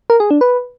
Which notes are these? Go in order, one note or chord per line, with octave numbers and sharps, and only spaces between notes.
A#4
G#4
D4
B4